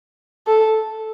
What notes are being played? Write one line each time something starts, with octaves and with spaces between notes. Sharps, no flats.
A4